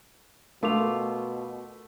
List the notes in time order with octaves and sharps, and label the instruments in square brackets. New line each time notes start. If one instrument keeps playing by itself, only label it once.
[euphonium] B2 [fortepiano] A3 [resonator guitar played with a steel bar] F4 [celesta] A#4 D6 F7